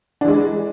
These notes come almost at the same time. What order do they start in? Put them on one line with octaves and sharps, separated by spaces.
D4 E3 G#3